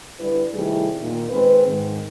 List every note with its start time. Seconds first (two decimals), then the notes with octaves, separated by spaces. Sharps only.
0.20 D3 G3 E4 B4
0.54 C3 D#3 G3 A3 E4 G#4
1.00 A#2 D#3
1.30 D#3 G#3 C4 B4
1.67 G#2 D#3